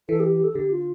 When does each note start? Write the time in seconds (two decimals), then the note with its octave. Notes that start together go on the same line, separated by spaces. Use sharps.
0.09 E3 A4
0.20 G4
0.32 G4
0.44 A4
0.55 D3 G4
0.71 F4